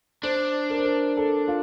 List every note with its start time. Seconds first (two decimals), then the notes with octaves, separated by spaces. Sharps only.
0.23 D4 C5
0.70 A#4
0.77 C5
0.85 A#4
1.17 A4
1.48 F4